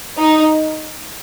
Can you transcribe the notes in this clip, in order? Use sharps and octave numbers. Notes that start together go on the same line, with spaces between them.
D#4